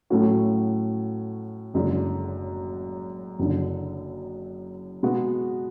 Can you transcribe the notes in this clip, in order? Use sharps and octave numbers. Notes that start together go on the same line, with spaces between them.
A2 F#3 A3 C#4 F#4
F#1 F#2 D3 G#3 D4
F#1 F#2 D3
B2 G#3 B3 F#4